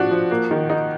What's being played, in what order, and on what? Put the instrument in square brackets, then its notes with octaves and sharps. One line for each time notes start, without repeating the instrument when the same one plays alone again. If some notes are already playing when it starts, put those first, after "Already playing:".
Already playing: [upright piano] F3 D4 F#4
F3
A#3
D#3
D#4